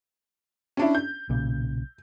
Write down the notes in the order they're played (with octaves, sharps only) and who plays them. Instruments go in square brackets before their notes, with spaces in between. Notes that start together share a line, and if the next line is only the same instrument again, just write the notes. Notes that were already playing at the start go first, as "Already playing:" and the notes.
[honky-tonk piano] C#4 D4 E4
G6
[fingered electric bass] B1 A#2 C#3